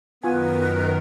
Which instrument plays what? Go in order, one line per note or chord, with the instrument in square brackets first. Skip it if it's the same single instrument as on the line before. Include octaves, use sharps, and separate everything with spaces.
[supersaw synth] F#2 D#3 A#4 [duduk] B3 [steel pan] F4 G#5 [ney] B4